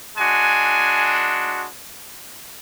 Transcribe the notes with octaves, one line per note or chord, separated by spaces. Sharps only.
G#3 D4 F#4 G#5